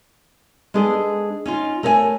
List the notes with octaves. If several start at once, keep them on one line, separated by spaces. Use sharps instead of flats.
G#3 B3 D4 G#4 A4
C#4 D#4 F4
A3 A#4 C#5 D#5 G#5